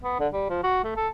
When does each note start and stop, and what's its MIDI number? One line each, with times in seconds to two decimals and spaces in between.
0.03 0.16 59
0.20 0.28 50
0.33 0.45 55
0.50 0.59 53
0.64 0.83 66
0.84 0.93 57
0.97 1.09 69